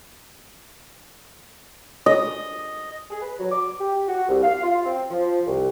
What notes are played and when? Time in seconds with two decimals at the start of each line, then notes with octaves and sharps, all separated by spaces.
2.06 D#5
3.10 G#4
3.22 B4
3.39 F#3
3.52 D6
3.79 G4
4.08 F#4
4.29 C2
4.43 F5
4.63 F4
4.84 C4
5.10 F3
5.46 C2